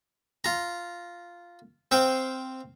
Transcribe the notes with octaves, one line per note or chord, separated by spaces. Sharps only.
F4 A#5
C4 C5 F5 G5